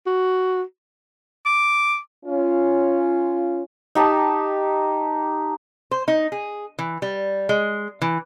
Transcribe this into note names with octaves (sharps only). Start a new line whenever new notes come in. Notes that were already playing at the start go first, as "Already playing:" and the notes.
F#4
D6
C#4 F4
D#4 G4 A5
C5
D#4
G#4
E3
G3
G#3
E3